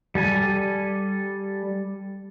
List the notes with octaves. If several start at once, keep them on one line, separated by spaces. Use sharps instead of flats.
G3 A4 G#5